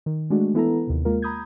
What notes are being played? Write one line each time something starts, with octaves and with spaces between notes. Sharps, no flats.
D#3
G#3 A3 D4 F#4
E3 B3 E4 A4 B4 A#5
D#2 C3
G#3 A#3 F4 A#4
A#5 B5 D#6 G6 G#6